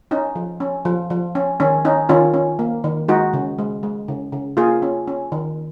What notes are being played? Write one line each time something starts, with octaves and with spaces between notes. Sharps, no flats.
C#4 D#4
F3
C#4
F3
F3
C#4
D#3 C#4
C#4 D#4
D#3 C#4 F4
C#4
A#3
D#3
G#3 D#4 F#4
C#3
G#3
G#3
C#3
C#3
A#3 F4 G#4
C#4
C#4
D#3